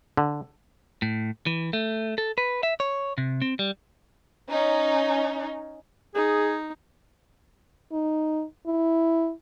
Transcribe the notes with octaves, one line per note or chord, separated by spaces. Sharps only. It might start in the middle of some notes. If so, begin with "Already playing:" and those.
D3
A2
E3
A3
A4
B4
E5
C#5
C3
C4
G3
C#4 D#4
D#4 G#4
D#4
E4